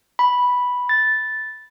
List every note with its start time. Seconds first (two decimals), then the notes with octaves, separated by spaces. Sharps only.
0.19 B5
0.89 A6